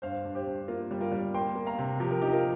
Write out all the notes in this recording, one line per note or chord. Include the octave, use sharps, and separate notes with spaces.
G2 C5 F5
G2
G4 C5
G2
A#3 F4
G3
F4 A#4
G3
A#3 G5 C6
A#3
F5 A#5
C3
F3 G4
A#4
F3 D#4 G4
F4 A#4